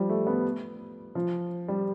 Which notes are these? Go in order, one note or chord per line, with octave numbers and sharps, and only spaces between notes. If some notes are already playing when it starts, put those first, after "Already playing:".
Already playing: F3 G3
A3
B3
F3
G3